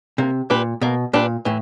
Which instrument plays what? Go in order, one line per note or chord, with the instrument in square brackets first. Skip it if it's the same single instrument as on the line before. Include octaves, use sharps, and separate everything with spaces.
[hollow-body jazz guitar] C3 [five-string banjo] A#3
[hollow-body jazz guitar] A#2 [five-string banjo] D4 G4 B4
[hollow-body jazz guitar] B2 [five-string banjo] A#3
[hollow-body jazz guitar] A#2 [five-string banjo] D4 G4 B4
[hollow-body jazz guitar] A2 [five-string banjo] E3